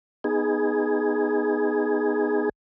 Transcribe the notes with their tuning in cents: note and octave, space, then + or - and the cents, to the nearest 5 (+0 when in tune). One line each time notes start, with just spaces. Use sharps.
B3 +0 D#4 +0 G#4 +0